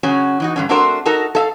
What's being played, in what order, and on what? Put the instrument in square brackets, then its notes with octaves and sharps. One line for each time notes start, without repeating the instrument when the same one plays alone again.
[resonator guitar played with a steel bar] C#3 F#3 C#4 F#4
E3 D#4 F#4
G2 D3 C#4
A3 C4 D4 F#4 A#4 C5
D#4 F#4 A4 A#4
A4 E5 F5